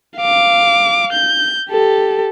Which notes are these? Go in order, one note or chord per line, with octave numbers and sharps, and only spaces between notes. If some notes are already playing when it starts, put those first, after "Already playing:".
F5 D6
G6
G4 A4